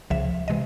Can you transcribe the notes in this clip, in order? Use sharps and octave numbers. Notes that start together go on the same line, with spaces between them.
C#2 C#3 F3 E5
C3 E3 G#3 D#5